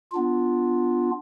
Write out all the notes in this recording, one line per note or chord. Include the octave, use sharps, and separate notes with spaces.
B3 D4 F4